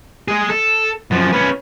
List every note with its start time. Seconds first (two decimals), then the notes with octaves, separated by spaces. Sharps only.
0.28 G#3 G#4
0.50 A4
1.11 F#2 F3
1.33 C#4 B4